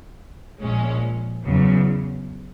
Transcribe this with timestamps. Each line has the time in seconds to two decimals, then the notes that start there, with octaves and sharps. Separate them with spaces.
0.62 A#1 A#2 G#3 C#4
1.44 E2 C#3 F#3